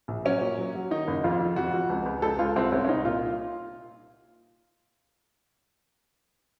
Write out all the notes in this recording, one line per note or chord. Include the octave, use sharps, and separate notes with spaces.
A#1
F#3 C#4
A#2
F#3
F#3
D#3 D#4
F#1
F2 F4
F2
F2 F#4
F2
C#2
C#2
C#2 A4
C#2 F4
C2 C4
C2 C#4
C#4
C2 D#4
A#2 F4